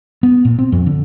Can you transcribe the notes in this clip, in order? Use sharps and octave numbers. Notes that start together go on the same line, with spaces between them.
B3
A#2
C4
F2
D3